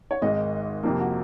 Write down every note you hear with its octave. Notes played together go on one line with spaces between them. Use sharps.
C#5
G#1 G#2 D#3 G#3 D#5
F2 C3 F3 A#3
F#4